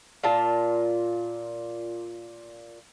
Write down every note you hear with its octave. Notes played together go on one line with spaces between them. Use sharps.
A#2 F4 A5